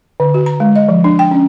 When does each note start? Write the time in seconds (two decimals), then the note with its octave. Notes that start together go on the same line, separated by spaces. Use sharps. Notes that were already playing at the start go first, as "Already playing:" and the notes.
0.20 D3
0.34 F#4
0.46 A#5
0.60 G#3
0.76 D#5
0.88 F3
1.04 D4
1.19 G5
1.31 C#4